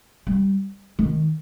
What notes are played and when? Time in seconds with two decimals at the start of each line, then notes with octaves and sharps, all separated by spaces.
0.27 G3
0.99 D#3